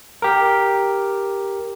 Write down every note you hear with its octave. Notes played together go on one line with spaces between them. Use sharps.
G4 A#4